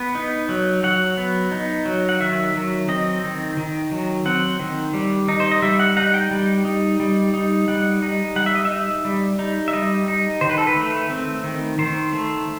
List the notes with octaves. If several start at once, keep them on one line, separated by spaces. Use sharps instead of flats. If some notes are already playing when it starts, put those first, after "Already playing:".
Already playing: B3 B4
D#4
F#3
F#3 F#5
B3
D#4
F#3
F#5
D#3 E5
F#3
C4 D#5
D#3
D#3
F#3
C4 F#5
D#3
G3
D#4
C5
D#5
G3 E5
F#5
D#4 F#5
G5
G3
D#4
G3
D#4
G3 F#5
D#4
G3 F#5
E5
D#5
E5
D#4
G3
D#4
E5
G3 D#5
D#4
D#3 C5
B4
A4
B4
A3
C4
D#3
D#3 C5
A3